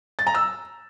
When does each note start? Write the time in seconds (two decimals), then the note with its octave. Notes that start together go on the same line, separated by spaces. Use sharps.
0.19 A6
0.27 A#5
0.34 E6